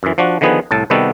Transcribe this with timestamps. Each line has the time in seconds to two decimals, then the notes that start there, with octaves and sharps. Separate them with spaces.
0.03 F#2 E3
0.18 F3 D4 F#4
0.41 D3 D#3 F3 B3 G#4 B4
0.71 C2 A2 A5
0.90 C3 D#3 G3 B3 F#4 A4